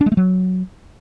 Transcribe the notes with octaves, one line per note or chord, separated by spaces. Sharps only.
D4
G#3
A3
F#3